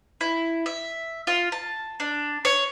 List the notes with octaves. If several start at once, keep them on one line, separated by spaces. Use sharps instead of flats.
E4
E5
F4
A5
D4
C#5